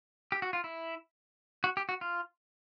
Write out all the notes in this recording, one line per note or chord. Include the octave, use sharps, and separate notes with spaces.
G4
F#4
F4
E4
F#4
G4
F#4
F4